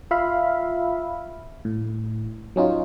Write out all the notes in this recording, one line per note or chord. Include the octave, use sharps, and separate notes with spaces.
F4 E5 F5 B5
A2
F#3 C#4 D#4 F4